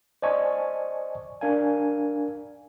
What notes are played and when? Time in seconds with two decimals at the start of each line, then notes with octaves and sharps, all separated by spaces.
0.22 C5 D5 D#5 G#5 A5 C#6
1.41 D4 A#4 F5 G#5